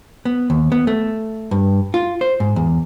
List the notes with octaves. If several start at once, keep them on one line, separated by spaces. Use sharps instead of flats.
B3
D#2
B3
A3
G2
F4
C5
G#2
E2